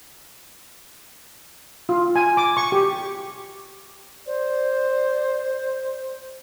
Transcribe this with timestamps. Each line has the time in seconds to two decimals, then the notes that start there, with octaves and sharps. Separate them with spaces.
1.89 F4
2.16 G#5
2.37 D6
2.57 C#6
2.72 G4
4.26 C5 D5